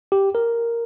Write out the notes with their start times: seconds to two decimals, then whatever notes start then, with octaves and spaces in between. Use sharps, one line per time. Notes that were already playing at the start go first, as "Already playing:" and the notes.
0.12 G4
0.35 A#4